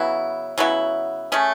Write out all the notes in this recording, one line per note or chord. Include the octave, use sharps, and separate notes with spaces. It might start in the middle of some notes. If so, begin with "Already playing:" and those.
Already playing: C#3 F#3 B3 E4
C#3 F#3 B3 E4
A3 C#4 G#4